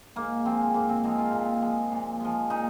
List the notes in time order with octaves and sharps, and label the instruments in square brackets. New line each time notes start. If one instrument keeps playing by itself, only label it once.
[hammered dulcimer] G#2 A#3
F3 G#3 C4
G#2 A#3
C4
F3 G#3 D#4
F4
A#2
F3 G#3
A#2
F3 G#3
A#2 D#4